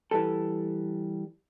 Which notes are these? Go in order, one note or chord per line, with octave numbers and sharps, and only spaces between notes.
E3 G3 A4